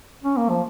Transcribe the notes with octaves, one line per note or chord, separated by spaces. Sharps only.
C#4
A#3
F3